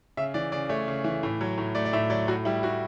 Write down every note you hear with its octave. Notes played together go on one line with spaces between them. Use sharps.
C#3 E5
E3 D5
C#3 D5
A3 C#5
C#3
E3
A2
F#3
A2
A3 D5
D5
A2 E5
F#3 D5
A2 F#4
G3 E4
A2 F#4